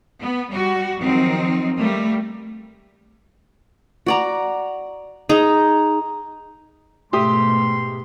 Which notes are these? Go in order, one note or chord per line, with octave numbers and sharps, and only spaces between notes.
B3
G3 F#4
D#3 F3 F#3 C4 D#4
G3 A3 A#3
F#4 D5 A#5
D#4 G#4 A#5
G#2 B2 A3 G4 E5 C6 D#6